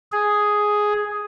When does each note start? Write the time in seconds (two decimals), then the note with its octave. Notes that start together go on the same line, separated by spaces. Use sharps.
0.12 G#4